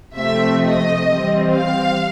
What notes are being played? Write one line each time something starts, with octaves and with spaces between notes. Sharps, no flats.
C3 F3 A3 C4 E5
D#5
E3 G3 C4
F5